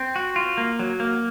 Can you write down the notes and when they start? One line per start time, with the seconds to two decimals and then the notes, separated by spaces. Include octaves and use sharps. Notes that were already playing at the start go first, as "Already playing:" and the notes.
Already playing: C4
0.16 F#4
0.36 F4
0.58 A#3
0.79 F#3
1.00 A#3